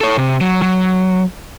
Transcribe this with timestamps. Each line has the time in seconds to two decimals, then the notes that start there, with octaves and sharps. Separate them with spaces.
0.01 A4 C#5
0.17 C3
0.41 F#3
0.62 F#3